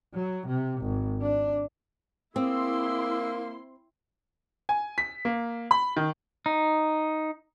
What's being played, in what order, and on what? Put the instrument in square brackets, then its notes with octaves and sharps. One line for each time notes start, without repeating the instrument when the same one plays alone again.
[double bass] F#3
C3
G#1
D4
[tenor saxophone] A#3 [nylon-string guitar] C4 [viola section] E4 C6 [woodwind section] G#4 D6 E6
[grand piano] G#5
B6
A#3
B5
D#3
[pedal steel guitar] D#4